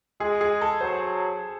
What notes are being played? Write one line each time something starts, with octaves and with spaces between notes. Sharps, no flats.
G#3 G#4
G#4
A4
F#3 C5